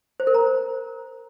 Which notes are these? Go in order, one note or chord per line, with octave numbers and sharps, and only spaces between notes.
C5
A#4
A#5